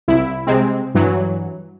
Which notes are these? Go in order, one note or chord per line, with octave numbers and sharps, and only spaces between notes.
C2 E4
C3 G#3 C4
G2 E3 F#3